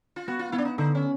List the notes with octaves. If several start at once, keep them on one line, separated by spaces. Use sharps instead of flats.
F4
B3 F#4
F4
B3 E4
D4
D#4
D3 D#4
C#4